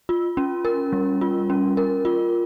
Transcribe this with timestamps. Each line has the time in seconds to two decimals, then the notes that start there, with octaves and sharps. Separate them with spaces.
0.09 F4
0.37 C#4
0.65 A#4
0.93 G3
1.21 F4
1.50 C#4
1.77 A#4
2.05 F4